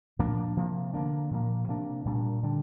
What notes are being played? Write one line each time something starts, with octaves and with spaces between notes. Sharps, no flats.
A#2 F3 A#3 D4
C3 F3 A#3
D3 A#3 D4
A#2 F3 A#3
C3 A#3 D4
A#2 G3 A#3 D4
D3 G3 D4